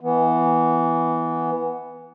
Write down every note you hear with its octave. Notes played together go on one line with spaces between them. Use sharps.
E3 B3